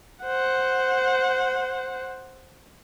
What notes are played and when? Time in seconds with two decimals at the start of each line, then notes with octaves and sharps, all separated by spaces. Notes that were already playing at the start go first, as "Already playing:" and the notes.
0.23 C5 F#5